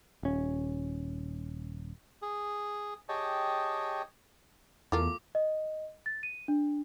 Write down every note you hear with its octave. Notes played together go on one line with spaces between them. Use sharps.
D#1 C#4
G#4
G4 G#4 C#5 D#5 G5 A5
E2 A3 F4 A#4 D6
D#5
A6
D#7
D4